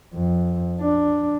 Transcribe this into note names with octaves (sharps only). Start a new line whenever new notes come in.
F2
D4